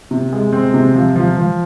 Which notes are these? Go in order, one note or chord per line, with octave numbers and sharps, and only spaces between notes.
C3
G#3
C4
C3
F3
F3
F3